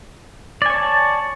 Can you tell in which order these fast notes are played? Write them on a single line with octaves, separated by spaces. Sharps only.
D5 G#5 C#5 A5